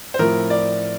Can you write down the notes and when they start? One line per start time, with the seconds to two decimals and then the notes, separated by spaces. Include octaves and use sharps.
0.14 C5
0.19 A2 F3 C4 E4 A#4
0.50 D5